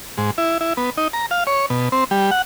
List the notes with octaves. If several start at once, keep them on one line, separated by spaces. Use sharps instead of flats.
G#2
E4
E4
B3
D#4
A#5
F5
C#5
B2
C4
G3
F#5